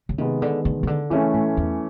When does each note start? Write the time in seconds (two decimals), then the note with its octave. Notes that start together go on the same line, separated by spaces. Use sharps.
0.09 C#3
0.18 C3 D#3 G#3 B3
0.42 D3
0.65 D3
0.83 C#3
0.87 D3
1.10 C#3 E3 A3 C#4
1.34 A2
1.57 E2